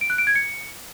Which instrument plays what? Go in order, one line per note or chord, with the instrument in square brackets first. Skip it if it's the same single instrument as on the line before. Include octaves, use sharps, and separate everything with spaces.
[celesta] D7
F#6
D7
G#6
C#7